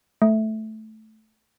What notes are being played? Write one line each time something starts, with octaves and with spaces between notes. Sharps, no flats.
A3